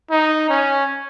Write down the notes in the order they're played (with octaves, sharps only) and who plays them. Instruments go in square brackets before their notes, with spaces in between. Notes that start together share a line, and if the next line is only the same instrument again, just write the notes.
[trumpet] D#4
C#4